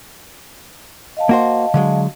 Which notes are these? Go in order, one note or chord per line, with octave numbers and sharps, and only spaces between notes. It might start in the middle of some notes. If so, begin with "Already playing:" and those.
D#5 F5 A5
A#3 F#4 C5
D3 F#3 G#3